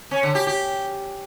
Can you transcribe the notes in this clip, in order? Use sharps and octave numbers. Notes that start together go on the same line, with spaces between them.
C#4
D3
G4
G4